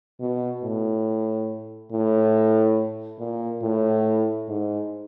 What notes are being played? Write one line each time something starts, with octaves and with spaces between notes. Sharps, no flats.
B2
A2
A2
A#2
A2
G#2